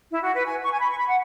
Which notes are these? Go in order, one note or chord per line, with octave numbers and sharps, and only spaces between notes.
E4
F#4
B4
G#5
C#6
G#5
B5
C#6
B5
F#5